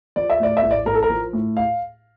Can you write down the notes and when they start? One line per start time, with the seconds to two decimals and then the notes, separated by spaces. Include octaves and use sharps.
0.16 F3 D5
0.30 E5
0.40 A2 D5
0.57 E5
0.63 A1
0.71 D5
0.86 A1 A#4
0.95 A4
1.03 A#4
1.10 F3
1.33 A2
1.57 F5